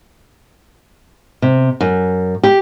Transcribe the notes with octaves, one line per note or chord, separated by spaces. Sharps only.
C3
F#2
G4